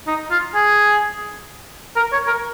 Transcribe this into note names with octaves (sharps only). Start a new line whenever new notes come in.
D#4
F4
G#4
A#4
C#5
A#4